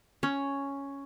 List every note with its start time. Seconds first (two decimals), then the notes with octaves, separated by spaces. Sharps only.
0.23 C#4